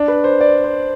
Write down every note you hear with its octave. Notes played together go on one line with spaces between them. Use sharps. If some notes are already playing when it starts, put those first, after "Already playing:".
Already playing: D4
B4
C5
D5
C5